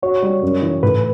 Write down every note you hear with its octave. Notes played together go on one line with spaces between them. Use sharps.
F#4 C#5
G3
F#2
E3
A2 B4